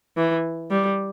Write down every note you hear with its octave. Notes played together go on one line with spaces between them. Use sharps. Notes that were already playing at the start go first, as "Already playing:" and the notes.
E3
G3